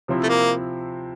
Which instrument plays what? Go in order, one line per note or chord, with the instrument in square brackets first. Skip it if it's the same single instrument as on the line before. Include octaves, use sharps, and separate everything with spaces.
[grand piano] C3 F3 C4 E4
[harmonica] A3
A#3